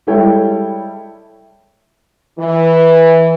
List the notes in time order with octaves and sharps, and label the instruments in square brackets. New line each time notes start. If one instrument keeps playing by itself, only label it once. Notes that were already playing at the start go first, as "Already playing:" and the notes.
[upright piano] G3 G#3 E4 A4 C#5 G5
[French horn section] E3